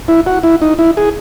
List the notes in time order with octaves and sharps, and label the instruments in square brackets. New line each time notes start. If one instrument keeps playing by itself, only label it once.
[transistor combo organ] E4
F#4
E4
D#4
E4
G#4